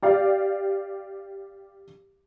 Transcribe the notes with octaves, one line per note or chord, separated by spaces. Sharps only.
G4 D5 F5